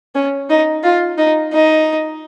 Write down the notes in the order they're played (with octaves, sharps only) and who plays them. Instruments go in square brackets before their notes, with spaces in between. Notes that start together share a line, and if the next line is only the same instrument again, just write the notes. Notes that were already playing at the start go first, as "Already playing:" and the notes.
[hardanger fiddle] C#4
D#4
F4
D#4
D#4